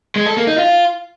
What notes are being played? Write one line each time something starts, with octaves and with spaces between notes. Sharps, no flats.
G#3
A4
A#3
D#4
F4